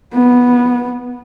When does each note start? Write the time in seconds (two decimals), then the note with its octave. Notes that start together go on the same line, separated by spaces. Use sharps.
0.14 B3